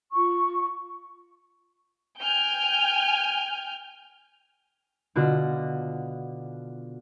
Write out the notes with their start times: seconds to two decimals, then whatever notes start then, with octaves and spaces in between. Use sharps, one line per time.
0.13 F4 C#6
2.21 G5 G#5 F6 G6
5.15 B2 D3 F4 F#4